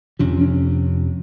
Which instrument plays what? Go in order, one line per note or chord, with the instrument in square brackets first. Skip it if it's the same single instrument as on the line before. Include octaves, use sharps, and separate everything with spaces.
[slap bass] F2 C3 F3 [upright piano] C#4
[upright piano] C#4